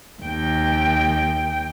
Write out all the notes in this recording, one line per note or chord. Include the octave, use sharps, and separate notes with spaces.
D#2 G5